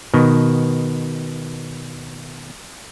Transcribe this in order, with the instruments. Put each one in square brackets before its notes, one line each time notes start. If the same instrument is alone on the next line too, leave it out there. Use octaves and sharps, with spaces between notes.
[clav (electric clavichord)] B2 D#3